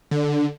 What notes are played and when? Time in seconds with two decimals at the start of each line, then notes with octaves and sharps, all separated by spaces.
0.11 D3